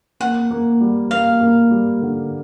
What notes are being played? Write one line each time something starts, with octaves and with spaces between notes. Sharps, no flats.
A#3 F#5
A#3
G3
A#3 F5
A#3
G3
D3